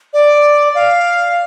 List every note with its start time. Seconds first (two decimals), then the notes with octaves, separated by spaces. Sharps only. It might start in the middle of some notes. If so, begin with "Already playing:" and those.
0.13 D5
0.75 F5